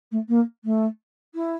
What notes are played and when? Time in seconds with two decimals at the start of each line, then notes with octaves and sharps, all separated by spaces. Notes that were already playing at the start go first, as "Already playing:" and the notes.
0.11 A3
0.28 A#3
0.64 A3
1.34 E4